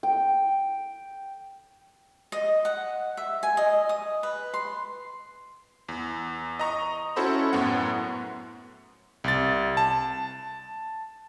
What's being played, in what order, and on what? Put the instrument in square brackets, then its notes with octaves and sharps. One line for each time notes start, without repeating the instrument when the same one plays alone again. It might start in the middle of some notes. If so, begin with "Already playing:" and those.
[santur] G5
[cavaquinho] D#5
F#5
E5
G#5
D#5
D#6
B4
C6
[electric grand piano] E2
D#5 A#5 C#6
C#4 E4 F#4 A4 C5 B5
F#2 A2 B3 F#5
C2 A6
A5